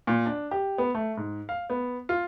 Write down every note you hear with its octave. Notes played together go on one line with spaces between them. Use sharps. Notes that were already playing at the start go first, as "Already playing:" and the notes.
A#2
D4
G4
B3
A3
G#2
F5
B3
F4